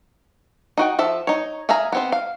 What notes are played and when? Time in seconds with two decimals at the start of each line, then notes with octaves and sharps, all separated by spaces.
0.78 D#4 F#4 G5
0.99 F3 A4 E5
1.27 D#4 C#5
1.69 G#4 E5 F5 G#5 A#5
1.92 B3 C4 C5
2.12 F5